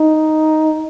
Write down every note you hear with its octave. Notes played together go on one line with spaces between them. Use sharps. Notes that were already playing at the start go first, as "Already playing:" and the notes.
Already playing: D#4